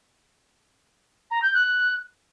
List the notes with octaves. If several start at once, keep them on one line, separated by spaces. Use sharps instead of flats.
A#5
G6
F#6